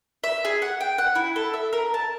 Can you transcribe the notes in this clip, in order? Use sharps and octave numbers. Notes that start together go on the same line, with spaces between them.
E5
G#4
F#5
G5
F#5
E4
A4
E5
A#4
A5